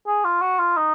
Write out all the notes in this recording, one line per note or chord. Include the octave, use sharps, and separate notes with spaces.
G#4
F4
F#4
F4
D#4